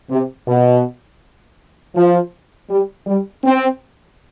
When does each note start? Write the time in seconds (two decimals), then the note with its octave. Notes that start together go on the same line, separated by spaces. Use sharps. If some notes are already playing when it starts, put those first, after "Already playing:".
0.10 C3
0.48 B2
1.95 F3
2.70 G3
3.07 G3
3.44 C4